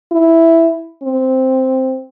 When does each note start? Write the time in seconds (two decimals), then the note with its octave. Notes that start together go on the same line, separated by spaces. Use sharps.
0.12 E4
1.03 C4